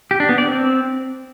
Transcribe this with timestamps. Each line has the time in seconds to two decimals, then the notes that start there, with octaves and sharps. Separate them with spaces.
0.11 G4
0.20 D4
0.29 B3
0.38 D5
0.47 C4